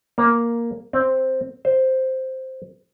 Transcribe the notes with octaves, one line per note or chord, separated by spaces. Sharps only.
A#3
C4
C5